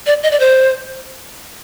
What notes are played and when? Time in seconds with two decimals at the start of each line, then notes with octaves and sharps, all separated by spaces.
0.06 D5
0.23 D#5
0.31 D5
0.40 C5